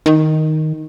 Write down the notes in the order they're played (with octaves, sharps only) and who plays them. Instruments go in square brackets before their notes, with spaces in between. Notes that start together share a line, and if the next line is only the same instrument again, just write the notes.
[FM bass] D#3